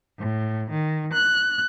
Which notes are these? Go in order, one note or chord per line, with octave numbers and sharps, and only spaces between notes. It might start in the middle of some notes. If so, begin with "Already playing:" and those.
A2
D#3
F#6